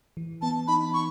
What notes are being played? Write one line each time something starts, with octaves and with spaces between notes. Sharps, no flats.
E3
B3 A5
D#4 B5
C#6